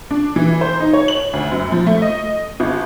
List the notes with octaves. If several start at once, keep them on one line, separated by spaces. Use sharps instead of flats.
D4
E3
C5
D#4
C#5
F#7
D2
F#2
F3
A3
D#5
G1